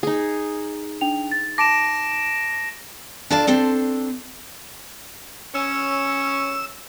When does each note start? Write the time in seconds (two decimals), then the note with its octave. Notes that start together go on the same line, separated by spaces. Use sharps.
0.03 D#4 G#4
1.01 D4 G5 F7
1.31 A6
1.58 A5 D6 A#6 D7 E7
3.30 D4 F4 A4 D5 F5 A5
3.47 C4 D4 A4 C5
5.55 C#4 E6